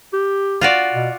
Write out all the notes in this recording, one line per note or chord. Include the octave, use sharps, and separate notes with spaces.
G4
F4 F#4 D5
B2